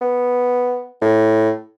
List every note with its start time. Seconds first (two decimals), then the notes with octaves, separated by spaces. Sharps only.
0.01 B3
1.02 A2